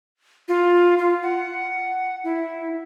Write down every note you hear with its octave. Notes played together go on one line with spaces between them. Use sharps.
F4
F4
F#5
E4